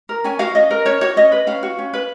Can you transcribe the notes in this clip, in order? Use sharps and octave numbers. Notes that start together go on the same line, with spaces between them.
A#4
C#4 G#5
F#4 F5
C#4 D#5
A#4
C#4 C#5
F#4 C#5
C#4 D#5
B4
C#4 F5
F#4
C#4
B4